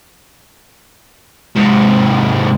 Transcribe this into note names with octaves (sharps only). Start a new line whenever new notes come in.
G#2 C3